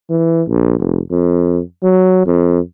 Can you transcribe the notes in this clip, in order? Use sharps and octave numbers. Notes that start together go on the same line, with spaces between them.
E3
A#1
F1
F2
F#3
F2